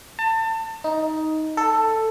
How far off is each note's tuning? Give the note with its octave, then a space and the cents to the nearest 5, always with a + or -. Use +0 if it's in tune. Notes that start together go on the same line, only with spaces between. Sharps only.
A5 +30
D#4 +10
A4 +10